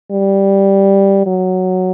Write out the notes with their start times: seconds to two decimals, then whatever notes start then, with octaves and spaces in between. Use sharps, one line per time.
0.11 G3
1.26 F#3